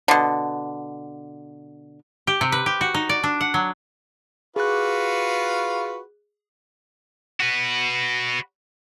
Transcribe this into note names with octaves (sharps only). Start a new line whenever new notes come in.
B2 D3
G4
C3
B4
G4
F#4
D#4
D5
D4
F#5
F#3
F4 F#4 G#4 B4 F#6
F#4 B4